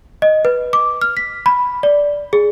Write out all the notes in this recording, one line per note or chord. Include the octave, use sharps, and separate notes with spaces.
D#5
B4
D6
F6
B6
B5
D5
G#4